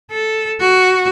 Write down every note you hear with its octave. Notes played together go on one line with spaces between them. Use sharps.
A4
F#4